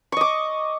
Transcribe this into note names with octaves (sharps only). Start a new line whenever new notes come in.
D#5 C#6 D6